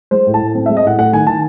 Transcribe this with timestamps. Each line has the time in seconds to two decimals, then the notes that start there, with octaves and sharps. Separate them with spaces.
0.11 G#3 C5
0.27 A2
0.34 A5
0.41 A2
0.55 C4
0.66 E5
0.70 G#3
0.77 D#5
0.84 A2 F#5
0.99 A3 F#5
1.13 D#3 G#5
1.27 D#3 A5